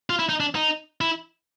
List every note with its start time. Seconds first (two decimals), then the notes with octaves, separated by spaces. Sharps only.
0.10 F4
0.19 E4
0.29 D#4
0.40 D4
0.55 D#4
1.01 E4